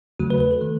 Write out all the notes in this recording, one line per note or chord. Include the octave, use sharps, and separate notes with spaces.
E2 C#3 F#3 A3 F#4
B4
B4
A4
D#3 A3